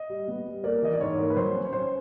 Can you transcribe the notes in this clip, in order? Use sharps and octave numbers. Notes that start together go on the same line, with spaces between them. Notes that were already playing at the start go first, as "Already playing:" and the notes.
Already playing: D#5
G3
B3
G3
A#3 D5
E3 D#5
D5
G#2 C#5
A#3
B4
F#3 C5
C#4
C#5
C#4 C5